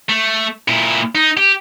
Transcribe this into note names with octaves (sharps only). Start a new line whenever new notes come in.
A3
A#2 E4
D#4
G4